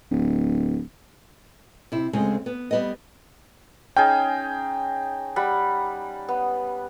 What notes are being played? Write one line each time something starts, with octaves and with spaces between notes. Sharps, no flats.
D1
C3 E4
D2 C#3 G#3 C4
B3
G3 B3 D#5
C#4 D#4 G#4 G5
G3 F#5 B5
B3